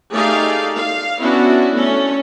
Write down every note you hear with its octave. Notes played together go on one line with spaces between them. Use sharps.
A3 D#4 G4 G#4 D5 F5
F5
B3 C#4 D4 E4 F#4
A3 C#4 A4